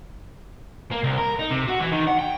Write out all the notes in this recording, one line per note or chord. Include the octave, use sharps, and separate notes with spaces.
A#3
C2
A#4
D#4
C3
F#4
E3
D#3
F#5
G5